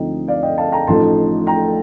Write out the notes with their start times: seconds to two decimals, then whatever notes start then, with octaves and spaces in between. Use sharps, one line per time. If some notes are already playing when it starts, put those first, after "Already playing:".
Already playing: D2 D3 F3 C4 D#4 D#5 G5
0.28 D5 F5
0.43 D#5 G5
0.58 F5 A5
0.72 G5 A#5
0.87 A1 A2 F3 A3 D#4 A5 C6
1.47 G5 A#5